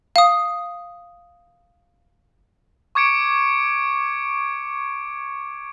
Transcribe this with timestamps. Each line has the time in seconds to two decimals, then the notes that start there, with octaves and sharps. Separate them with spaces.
0.16 F5 D#6
2.95 C#6 D6 G#6 C#7 D7